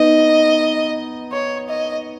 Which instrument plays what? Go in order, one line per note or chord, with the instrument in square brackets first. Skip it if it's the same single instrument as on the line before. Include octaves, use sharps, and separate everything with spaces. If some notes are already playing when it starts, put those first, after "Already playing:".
Already playing: [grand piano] B3 D#4 [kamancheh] D#5
[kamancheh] C#5
D#5